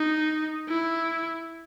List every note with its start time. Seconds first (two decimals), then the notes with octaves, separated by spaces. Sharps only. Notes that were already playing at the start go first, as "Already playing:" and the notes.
Already playing: D#4
0.68 E4